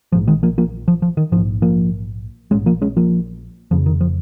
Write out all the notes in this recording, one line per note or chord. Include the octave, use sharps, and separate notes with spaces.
A#1 G#2 F3
D#3 G#3
F3 A#3
F3 A#3
F3
F3
D#3
A#1 G#2 F3
F3 A#3
A#1 G#2 G#3 C#4
F3 A#3
G#3 C#4
F3 A#3
F1 F2 C#3 F3
D#3
F3